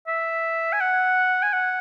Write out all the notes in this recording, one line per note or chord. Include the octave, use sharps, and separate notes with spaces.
E5
G#5
F#5
G#5
F#5